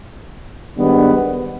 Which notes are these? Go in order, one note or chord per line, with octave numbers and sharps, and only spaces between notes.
G#2 D#3 G3 B3 D4